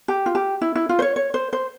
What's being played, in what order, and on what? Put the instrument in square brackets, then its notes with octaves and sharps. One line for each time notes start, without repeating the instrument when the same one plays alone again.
[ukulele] G4
F4
G4
E4
E4
F4
C5
C#5
C#5
C5
C5